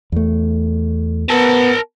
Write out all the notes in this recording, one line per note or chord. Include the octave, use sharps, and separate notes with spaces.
E2 A3
B3 A#4 A5